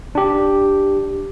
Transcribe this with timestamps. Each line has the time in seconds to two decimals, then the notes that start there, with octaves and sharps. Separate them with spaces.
0.15 D4 G4